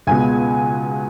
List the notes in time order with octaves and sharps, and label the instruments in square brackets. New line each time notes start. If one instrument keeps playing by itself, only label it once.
[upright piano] C#2 B2 G#3 B3 G#5